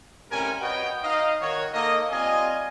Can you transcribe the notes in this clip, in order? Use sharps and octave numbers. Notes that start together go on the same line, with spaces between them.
A2 C3 G3 C#4 A#4 G#5
F#4 B4 C#5 D#5 G5
D#4 D#5 F5
D#3 F#4 C#5
A#3 D#4 A4 D#5
G3 C4 F4 D#5 G#5